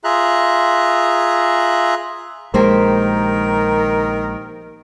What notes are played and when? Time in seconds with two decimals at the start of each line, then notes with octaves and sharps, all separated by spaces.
0.04 F4 G#4 E5 A#5 F#6
2.54 A#1 D#3 G#3 A#3 G4 A#4 C5